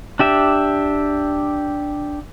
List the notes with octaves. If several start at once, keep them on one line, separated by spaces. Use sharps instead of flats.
D4 G4 E5